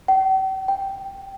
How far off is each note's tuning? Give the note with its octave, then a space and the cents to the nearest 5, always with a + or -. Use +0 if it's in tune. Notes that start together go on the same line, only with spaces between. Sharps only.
G5 -45
G5 -5